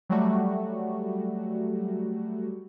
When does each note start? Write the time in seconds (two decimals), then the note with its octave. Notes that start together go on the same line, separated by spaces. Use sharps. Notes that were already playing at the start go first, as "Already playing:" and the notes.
0.10 F#3 G3 A3 F#4